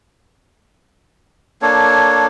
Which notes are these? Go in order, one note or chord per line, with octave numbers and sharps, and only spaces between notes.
A#3 D4 A4 C#5